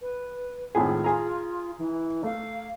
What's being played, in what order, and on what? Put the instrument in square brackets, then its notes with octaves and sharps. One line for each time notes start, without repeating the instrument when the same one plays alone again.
[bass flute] B4
[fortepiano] G#1 A2 G#4 [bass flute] F4
[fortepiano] G#4 A#5
[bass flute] E3
[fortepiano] A3 [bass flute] F5